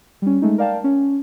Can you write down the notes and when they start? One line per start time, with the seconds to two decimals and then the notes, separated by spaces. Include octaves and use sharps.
0.22 G3 C#4
0.42 G#3 A3 D#4
0.58 A#4 D5 F5 G5 A5
0.84 C#4